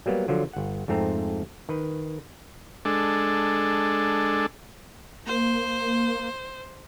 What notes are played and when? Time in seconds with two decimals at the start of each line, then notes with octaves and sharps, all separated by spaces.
0.06 F#3 G3 A#3 B3
0.28 D3 F3 F#3
0.53 G1 F#5
0.88 F2 G#2 A3 C4 A#5
1.69 D#3 B4
2.85 G#3 D4 A4
5.27 A#3 C5